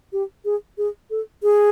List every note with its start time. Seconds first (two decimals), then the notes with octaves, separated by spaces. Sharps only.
0.13 G4
0.45 G#4
0.78 G#4
1.10 A4
1.43 G#4